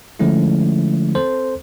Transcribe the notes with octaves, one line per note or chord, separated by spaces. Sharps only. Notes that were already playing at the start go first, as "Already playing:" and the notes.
D3 F3 G#3 A3 C#4 E4
C4 A4 C5